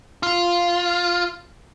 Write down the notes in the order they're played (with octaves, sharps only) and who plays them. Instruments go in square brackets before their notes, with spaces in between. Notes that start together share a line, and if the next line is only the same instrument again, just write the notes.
[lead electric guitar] F4